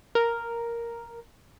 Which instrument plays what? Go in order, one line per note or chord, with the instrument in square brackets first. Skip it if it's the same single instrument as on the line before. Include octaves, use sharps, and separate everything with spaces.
[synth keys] A#4